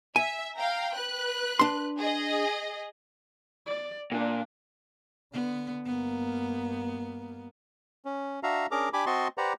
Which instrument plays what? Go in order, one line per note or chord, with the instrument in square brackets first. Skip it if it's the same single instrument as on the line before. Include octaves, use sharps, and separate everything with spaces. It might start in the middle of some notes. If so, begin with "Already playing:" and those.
[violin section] E5 [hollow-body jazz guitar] G#5
[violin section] F5 G5 A#5
B4 F#6
[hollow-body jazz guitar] D4 C6
[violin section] G#4 D#5
[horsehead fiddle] D5
[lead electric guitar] A#2 [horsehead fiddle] D4
[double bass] D3 [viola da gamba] B3
[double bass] G2 A#3 [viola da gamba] B3
[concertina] C#4
D4 F#4 E5 F5 A#5
C#4 D4 G#4 A#4 A#5 D6
D4 G4 G#5 B5 D6
C4 F#4 D#5 A5 C6 C#6
G4 B4 C5 D5 F#5 A#5